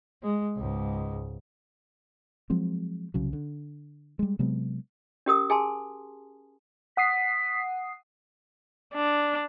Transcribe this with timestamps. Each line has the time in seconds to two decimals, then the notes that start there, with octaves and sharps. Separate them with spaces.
0.23 G#3
0.56 C#2 G#2
2.50 F3 F#3 G#3 C4
3.14 C2 C#3 F#3
3.33 D3
4.19 G3 G#3
4.39 C3 F#3 G#3 B3
5.26 C#4 G4 A#4 D#6
5.50 G#4 G#5 A5 C6
6.97 F#5 D#6 B6 C7
8.94 D4